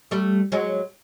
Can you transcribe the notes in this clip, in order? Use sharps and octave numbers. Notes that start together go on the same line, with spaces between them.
G3 A3
F#3 G#3